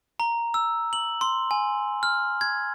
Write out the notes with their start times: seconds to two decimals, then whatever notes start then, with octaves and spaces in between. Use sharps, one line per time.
0.20 A#5
0.54 E6
0.93 F#7
1.21 C6
1.51 G#5
2.03 F6
2.41 G#6